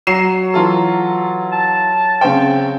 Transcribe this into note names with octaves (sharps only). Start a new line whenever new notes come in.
F#3 C7 E7
E3 F4 A4
A5
C#3 C4 G5